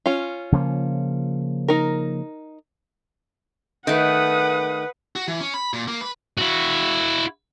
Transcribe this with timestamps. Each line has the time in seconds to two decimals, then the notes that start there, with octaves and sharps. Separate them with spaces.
0.06 C#4 F4
0.52 C#3 F3 A#3
1.68 D#4 A#4
3.87 D#3 A3 B4 F#5 D#6
5.16 F#4
5.28 E3
5.41 C#4
5.54 B5
5.73 A#2
5.88 A#3
6.01 B4
6.39 E4 F#4